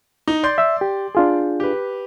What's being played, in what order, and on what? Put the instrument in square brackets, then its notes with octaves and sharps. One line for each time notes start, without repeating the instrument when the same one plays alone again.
[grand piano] D#4
D5 C6 G6
[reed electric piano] E5 E6
G4
D4 F4 G#4
[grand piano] G4 B4